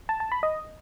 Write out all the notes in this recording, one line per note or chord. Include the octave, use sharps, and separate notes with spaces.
A5
A5
B5
D#5